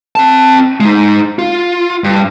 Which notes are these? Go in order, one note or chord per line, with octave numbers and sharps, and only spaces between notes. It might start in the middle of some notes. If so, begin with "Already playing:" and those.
C4 A5
G#3 D#4
F4
G2